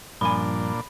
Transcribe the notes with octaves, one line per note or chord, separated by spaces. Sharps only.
G2 A#2 F3 D4 G#5 B5